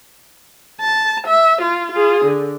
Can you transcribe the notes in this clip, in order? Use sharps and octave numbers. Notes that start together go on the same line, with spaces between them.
A5
E5
F4
F4 G#4
D3